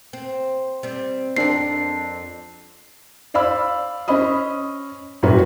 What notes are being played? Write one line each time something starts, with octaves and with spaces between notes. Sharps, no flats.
C4
G3 C4
F2 C4 D4 A#4 A5 C7
C5 D5 F5 B5 E6
C#4 C5 D#5 B5 D#6
F#2 A#2 G3 F#4 B4 C#5